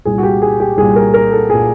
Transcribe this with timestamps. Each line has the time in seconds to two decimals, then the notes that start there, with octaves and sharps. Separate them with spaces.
0.05 C2 A#2 G#4
0.18 F#4
0.23 G4
0.42 G#4
0.60 G4
0.77 C2 A#2 G#4
0.96 A#4
1.14 A#4
1.32 A4
1.50 A#2 G#4